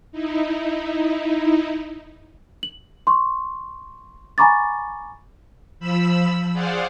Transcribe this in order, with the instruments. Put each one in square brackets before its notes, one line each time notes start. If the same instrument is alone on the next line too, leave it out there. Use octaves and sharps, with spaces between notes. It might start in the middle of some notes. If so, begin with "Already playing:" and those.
[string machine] D#4 E4
[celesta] F#7
C6 C#6
G#5 A#5 B5 C#6 D6 A6
[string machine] F3 B5 E6
G#4 C5 D5 F5 F#5